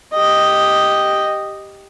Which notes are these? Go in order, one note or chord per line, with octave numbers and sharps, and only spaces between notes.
G4 D#5